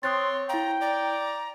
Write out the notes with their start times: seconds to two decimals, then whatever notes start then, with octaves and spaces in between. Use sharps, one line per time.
0.03 C4 C#5 C6 D#6 F#6 A6
0.49 E4 F5 G5 A#5
0.81 D5 A#5